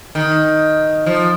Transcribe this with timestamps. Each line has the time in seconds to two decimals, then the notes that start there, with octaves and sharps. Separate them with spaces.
0.15 D#3
1.06 F3